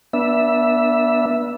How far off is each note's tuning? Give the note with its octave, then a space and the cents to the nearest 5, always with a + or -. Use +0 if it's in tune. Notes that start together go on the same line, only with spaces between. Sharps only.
B3 -35 D4 +0 E5 +0